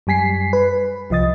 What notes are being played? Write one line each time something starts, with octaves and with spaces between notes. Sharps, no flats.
F#2 G3 G#5 B6 C7
B4
C2 F3 D#5 D#6 A6